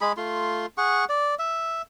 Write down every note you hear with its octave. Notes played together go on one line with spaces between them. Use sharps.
G#3 G#4 B5
A3 F4 C6
G#4 F#5 C#6
D5
E5